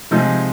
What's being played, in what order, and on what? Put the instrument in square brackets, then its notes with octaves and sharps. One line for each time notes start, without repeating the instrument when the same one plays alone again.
[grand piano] C3 F3 G#3 D#4 G#4